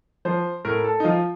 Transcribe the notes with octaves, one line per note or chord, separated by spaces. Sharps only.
F3 C5
A2 A#4
A4
D#4
F3 F4